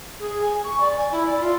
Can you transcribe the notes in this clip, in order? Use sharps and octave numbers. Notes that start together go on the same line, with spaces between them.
G#4
G#5
C#6
D5
G#5
E4
D5
F4